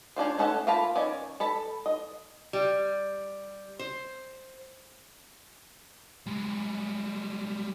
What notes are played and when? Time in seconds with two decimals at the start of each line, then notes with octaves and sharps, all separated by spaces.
0.16 C#4 D4 F4 C5
0.38 A3 C#4 A4 F#5 A5
0.67 A#3 F4 F5 A5 B5
0.95 D#3 C#4 D5
1.40 A4 A5 B5
1.86 D#5
2.53 G3
3.79 C5
6.27 G3 G#3